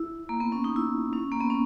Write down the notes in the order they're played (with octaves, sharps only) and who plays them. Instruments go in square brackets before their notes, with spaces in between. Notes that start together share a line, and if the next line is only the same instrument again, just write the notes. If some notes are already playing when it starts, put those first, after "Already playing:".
Already playing: [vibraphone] E4
A#3
B3
C#4
D#4
E4
C#4
A#3
B3
C#4